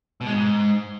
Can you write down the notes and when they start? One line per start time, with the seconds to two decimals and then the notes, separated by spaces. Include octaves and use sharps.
0.21 B2
0.27 G#3
0.32 G#2